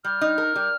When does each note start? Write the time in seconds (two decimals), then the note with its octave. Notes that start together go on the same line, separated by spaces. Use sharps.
0.04 G3 F6
0.21 D#4
0.38 A#4
0.55 G3